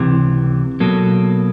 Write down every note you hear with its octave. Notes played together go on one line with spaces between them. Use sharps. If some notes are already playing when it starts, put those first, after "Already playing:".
Already playing: C#2 C3 E3
B2 F#3 A#3 A4